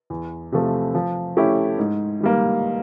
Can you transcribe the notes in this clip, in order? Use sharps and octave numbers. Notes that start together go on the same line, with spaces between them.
E2
C3 F3 A3
F3
A3 C#4 E4 G4
G#2
D#3 G3 A#3